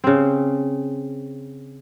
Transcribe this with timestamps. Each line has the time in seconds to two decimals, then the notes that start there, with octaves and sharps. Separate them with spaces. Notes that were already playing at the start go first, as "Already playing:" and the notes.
0.04 C#3 C4